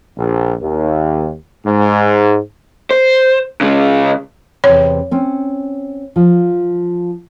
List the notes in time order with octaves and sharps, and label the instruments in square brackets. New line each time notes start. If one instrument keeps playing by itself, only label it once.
[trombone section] A#1
D#2
G#2
[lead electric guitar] C5
C#3 G#3
[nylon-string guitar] E2 C3 [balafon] C#5
[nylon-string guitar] C4 C#4
F3